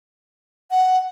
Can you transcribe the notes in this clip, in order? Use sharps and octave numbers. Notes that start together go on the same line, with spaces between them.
F#5